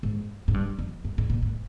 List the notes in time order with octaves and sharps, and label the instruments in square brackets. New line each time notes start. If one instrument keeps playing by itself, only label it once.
[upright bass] G#2
G#2
G2
F2
G2
G#2
A#2
G#2